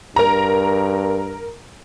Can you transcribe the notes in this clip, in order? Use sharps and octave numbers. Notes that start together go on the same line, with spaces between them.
G2 A#4 A#5